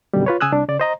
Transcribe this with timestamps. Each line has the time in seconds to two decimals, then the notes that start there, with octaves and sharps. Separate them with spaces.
0.14 F#2 B2 D3 D#3 G3
0.26 F4 B4 C#5
0.41 C#3 G#5 D#6 E6 F#6
0.52 C2 D4
0.68 C#3 D5
0.80 C5 D#5 A#5